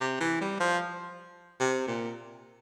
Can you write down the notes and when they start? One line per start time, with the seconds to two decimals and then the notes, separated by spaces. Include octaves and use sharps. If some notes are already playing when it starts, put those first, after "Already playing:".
0.01 C3
0.20 E3
0.41 G3
0.60 F3
1.60 C3
1.87 A#2